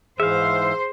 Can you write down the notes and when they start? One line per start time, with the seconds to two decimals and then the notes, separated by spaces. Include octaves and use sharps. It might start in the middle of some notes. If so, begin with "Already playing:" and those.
0.20 G#2 E3 G#4 C5 E5 F5